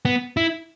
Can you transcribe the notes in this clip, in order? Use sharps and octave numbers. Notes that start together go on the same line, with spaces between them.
B3
E4